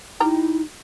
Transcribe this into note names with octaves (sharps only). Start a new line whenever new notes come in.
G3 D#4 E4 G5 A#5